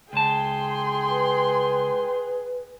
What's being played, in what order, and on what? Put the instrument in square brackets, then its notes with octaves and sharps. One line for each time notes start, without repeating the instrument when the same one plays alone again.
[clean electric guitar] C#2 A5 [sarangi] G#4 [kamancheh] G5 C6
[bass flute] B4